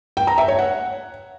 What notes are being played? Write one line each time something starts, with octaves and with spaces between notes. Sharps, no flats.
G5
A#5
E5
C#5
F#5